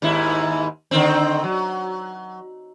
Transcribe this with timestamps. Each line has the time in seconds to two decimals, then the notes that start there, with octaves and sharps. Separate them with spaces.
0.02 D#2 G#2 E4
0.91 D3 D#3 C4
1.44 F#3